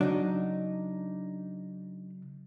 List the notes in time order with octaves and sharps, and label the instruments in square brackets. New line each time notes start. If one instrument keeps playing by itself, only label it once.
[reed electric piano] C#3 F#3 [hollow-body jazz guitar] D4 D#4